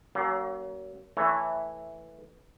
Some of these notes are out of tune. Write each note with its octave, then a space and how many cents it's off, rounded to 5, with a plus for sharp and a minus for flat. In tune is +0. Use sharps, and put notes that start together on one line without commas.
F#3 +35 A#3 +0 C#4 +20
E3 -5 A3 +0 C#5 +0